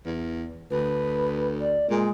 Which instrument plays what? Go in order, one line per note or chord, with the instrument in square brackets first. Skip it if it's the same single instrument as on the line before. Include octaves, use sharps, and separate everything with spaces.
[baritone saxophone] E2
[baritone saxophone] D2 [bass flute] B4
[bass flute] D5
[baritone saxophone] A#2 [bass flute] G#3